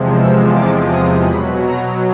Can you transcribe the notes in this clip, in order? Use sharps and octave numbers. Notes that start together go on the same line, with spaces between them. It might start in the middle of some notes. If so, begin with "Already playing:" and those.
Already playing: E2 C3 F3 G#3
E6
D6
D#6
B2 F#3 B5
A#5